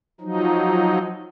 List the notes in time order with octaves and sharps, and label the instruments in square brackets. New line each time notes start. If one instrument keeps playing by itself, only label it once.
[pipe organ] F3 F#3 D#4